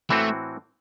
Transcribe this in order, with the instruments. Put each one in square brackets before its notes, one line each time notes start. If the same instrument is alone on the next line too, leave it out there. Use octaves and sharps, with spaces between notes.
[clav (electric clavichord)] A2 E3 C4 F#4 [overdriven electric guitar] A3